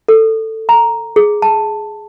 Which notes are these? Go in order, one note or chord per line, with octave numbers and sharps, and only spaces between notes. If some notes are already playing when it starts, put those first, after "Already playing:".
A4
A#5
G#4
A5